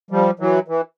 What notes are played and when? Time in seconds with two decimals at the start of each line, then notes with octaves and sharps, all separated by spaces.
0.11 F3 G3
0.39 E3 F#3
0.68 E3